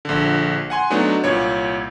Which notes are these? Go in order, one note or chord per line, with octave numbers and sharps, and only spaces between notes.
A#1 D3
F#5 G#5 C6
F#3 A3 B3 D4 D#4 F#4
C2 A#2 C#5